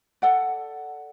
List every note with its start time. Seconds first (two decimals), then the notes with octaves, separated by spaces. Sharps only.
0.22 A4 D5 F#5